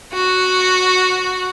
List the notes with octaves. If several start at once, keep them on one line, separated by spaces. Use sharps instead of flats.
F#4